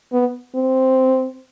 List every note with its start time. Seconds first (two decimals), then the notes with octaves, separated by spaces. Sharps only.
0.13 B3
0.55 C4